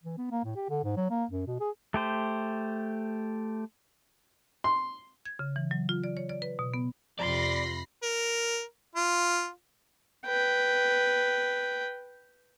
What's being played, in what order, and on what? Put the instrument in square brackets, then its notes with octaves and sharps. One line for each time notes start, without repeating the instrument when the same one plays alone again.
[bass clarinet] E3
B3
A#3
A2
G4
D3
G#2
F#3
A#3
F#2
B2
G#4
[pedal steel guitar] A3 G4 C5
[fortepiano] C6
[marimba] G#6
C#3
E3
F#3
F4
D5
C#5
D5
B4
B2
B3
[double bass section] F2 C3 [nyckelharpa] F4 C6 [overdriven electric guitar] D5 [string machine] B5 A#6 C7
[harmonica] A#4
F4
[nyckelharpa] B4 G5